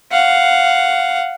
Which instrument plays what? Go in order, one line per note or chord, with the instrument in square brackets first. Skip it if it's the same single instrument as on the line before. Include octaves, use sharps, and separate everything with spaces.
[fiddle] F5 F#5